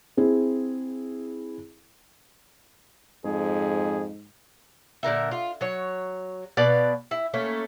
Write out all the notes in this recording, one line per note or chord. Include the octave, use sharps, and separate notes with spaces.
C4 E4 G#4
F2 G#2 G#4
A#2 D3 A#4 E5
F4
F#3 C#5
B2 B4 D5 F5
E4
A3 A#3 C#4